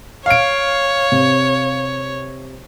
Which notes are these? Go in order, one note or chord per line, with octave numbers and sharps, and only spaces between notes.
C#5 F5 D7
C3